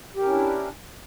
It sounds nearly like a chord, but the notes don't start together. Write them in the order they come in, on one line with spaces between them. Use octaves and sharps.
G4 A#4 C#4 E4 D4